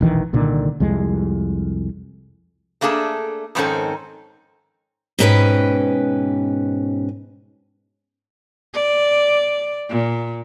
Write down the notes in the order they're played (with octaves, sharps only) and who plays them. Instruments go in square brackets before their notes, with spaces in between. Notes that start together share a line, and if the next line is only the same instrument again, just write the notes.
[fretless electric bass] E1 A#1 D#3 E3
C2 A#2 D3 D#3
C2 F2 G#3
[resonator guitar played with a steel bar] A3 A#3 D4 G#4 A4
F2 G#2 D#3 C4 C#4 A4
[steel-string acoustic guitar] G#2 B2 B3 C#4 B4 G5
[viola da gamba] D5
A#2